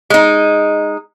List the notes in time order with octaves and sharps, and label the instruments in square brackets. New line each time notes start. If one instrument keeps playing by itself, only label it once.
[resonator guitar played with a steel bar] G#3 D#4